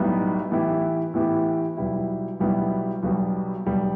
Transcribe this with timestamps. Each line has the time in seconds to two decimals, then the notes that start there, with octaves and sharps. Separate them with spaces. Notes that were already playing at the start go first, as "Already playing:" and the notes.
Already playing: B1 A2 G3 B3 D#4
0.51 A2 E3 B3 E4 G4
1.14 A2 E3 B3 E4 G4
1.77 B1 B2 G3 B3 E4
2.40 B1 B2 G3 B3 E4
3.03 B1 B2 G3
3.66 B1 B2 G3